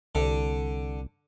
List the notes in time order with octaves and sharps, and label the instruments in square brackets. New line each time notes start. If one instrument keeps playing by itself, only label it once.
[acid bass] C2 [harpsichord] D3